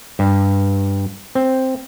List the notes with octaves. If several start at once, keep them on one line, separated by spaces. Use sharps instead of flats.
G2
C4